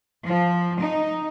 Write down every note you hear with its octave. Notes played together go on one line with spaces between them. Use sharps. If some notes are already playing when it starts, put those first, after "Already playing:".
F3
D#4